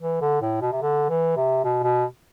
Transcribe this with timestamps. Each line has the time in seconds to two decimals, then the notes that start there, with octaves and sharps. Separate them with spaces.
0.01 E3
0.21 D3
0.42 A2
0.62 B2
0.72 C3
0.82 D3
1.09 E3
1.36 C3
1.64 B2
1.83 B2